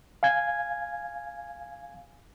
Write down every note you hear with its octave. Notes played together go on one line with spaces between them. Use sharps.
F5 G#5 G#6